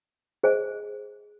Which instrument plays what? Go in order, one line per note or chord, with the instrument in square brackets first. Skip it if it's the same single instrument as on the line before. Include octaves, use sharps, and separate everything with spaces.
[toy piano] G#4 C5 D#5 G#5